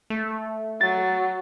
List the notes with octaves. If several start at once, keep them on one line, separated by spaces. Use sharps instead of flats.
A3
F#3 A6